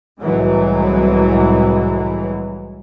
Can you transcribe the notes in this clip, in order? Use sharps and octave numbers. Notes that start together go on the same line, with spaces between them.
C2 A2 E3 F#3 G#3